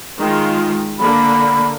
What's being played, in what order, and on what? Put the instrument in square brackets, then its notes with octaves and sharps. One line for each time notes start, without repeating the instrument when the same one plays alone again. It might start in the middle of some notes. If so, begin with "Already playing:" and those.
[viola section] D#3 G#3 F4
[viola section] D3 A#3 [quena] B5